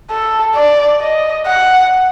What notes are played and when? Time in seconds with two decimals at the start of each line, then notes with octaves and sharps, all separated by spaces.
0.11 A4
0.55 D5
1.01 D#5
1.47 F#5